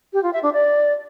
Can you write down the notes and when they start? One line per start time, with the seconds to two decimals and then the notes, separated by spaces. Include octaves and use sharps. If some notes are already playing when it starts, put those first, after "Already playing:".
0.13 G4
0.23 F4
0.33 E5
0.43 D4
0.53 D5